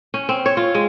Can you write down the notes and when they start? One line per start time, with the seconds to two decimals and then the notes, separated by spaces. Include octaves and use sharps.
0.14 C#4
0.29 C4
0.46 C#5
0.57 F4
0.75 G#3